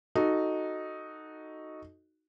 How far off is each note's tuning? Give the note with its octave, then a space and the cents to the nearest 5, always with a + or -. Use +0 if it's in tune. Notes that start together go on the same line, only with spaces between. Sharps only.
D#4 +0 F#4 +0 A4 +0